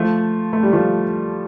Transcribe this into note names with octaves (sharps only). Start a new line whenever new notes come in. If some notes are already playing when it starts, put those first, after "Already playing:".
Already playing: F3 A3
A3
G3
F3 A3